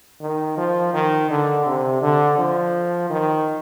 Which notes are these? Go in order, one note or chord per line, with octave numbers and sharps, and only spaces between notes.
D#3
F3
D#3
D3
C3
D3
F3
D#3